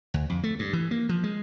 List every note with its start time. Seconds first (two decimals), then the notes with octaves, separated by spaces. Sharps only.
0.14 D2
0.30 F2
0.43 A3
0.59 G2
0.73 E3
0.91 A#3
1.09 F3
1.23 G#3